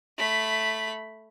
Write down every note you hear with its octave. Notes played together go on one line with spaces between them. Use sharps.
A3 B5